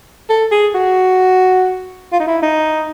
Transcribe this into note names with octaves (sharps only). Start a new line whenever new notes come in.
A4
G#4
F#4
F4
D#4
E4
D#4